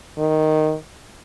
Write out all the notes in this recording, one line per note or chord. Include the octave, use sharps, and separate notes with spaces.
D#3